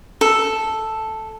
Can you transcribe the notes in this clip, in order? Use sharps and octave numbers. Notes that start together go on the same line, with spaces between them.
A4